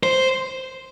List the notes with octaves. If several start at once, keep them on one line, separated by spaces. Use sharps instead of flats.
C5